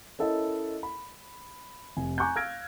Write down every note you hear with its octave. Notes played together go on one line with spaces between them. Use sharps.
C#4 E4 A4 A#4 D#5
B5
F1 G#5
G#5 A#5 C#6 D6 F#6 G6
F5 E6 F6 G#6 A#6 D7